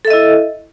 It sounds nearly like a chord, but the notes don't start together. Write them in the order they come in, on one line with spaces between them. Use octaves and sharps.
A4 E5 D#5 E4